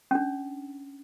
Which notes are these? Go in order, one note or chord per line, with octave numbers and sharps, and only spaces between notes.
C#4 D4